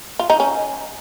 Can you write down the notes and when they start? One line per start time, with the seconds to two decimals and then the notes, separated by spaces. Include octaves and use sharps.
0.19 F4
0.30 D#4
0.40 C#4